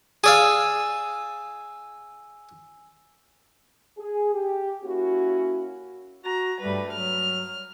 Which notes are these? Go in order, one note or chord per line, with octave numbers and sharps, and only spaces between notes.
G#4 D5 F5 G#5 E6
G#4
G4
A#3 C#4 E4 F#4
F#4 A#5
G2 G3 A3 B4
F#3 F6